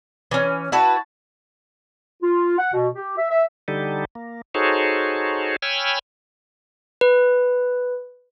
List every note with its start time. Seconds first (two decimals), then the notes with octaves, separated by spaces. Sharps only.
0.31 E3 C#4
0.72 E4 F#4 B4 A5
2.23 F4
2.59 F#5
2.73 B2
2.96 G4
3.18 E5
3.31 E5
3.68 D3 G3 D#4 G4 A4
4.15 A#3
4.55 D#4 F#4 G#4 A4 C5 C#5
5.62 C#5 G5 G#5 B5 E6 F6
7.01 B4